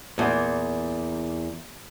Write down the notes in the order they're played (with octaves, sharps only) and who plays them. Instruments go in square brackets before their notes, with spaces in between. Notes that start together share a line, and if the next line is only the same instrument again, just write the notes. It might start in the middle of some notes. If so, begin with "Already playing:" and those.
[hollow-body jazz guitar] E2 A#2